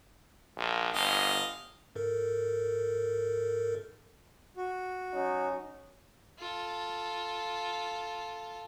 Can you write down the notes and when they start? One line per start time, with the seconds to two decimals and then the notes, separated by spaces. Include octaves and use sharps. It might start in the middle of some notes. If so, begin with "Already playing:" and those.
0.57 A#1
0.94 G1 D#5 F5
1.95 G#2 A4 A#4
4.57 F#4
5.14 F#3 C#4 D#4
6.39 F4 A4